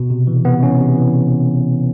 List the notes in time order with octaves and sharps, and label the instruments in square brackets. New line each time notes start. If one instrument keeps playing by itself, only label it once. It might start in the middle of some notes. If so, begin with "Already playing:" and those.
Already playing: [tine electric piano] B2
C3
E3
C3 B3
E3 C#4
C3
E3